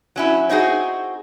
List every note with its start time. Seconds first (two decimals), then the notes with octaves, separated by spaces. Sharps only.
0.16 F#3 C#4 E4
0.49 C4 D#4 F#4 G#4